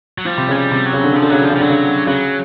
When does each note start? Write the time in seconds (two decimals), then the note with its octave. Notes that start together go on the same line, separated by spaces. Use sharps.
0.18 F#3
0.25 F3 G3
0.38 C3
0.48 C#3 G#3
0.56 G3
0.71 C3
0.86 F#3
0.93 C#3
1.04 D3
1.13 C#3 F3
1.22 D3
1.30 C#3 F#3
1.42 D3 F3
1.50 C#3
1.56 F3
1.60 D3 F#3
1.70 C#3
2.07 C#3 F#3